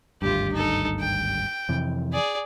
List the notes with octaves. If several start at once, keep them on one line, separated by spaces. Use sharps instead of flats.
G#1 D2 G2 F4 G4
D#4 A4
G5
F2 C3 E3
G#4 D5